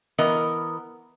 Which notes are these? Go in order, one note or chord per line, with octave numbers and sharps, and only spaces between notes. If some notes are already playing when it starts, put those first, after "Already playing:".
E3 B3 A#4 D#5